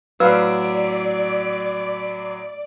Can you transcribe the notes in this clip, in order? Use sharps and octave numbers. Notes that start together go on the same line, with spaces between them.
A2 F#3 B4 D5 F5 E6